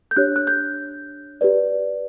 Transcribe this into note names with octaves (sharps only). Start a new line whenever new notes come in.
G6
D4 G4 C#5 F#6
F#6
G6
G4 B4 D5